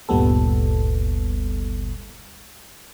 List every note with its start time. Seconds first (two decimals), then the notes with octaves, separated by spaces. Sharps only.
0.09 G1 D2 A#2 G3 B3 A4